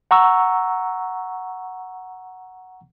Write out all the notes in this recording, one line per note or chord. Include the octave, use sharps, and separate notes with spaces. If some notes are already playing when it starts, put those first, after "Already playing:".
F#5 A#5 C#6 E6